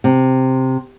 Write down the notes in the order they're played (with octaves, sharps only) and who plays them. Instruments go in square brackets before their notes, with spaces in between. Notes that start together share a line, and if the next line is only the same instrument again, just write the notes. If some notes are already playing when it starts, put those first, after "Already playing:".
[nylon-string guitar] C3